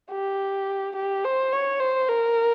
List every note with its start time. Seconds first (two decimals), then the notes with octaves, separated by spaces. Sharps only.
0.11 G4
0.96 G4
1.24 C5
1.52 C#5
1.80 C5
2.08 A#4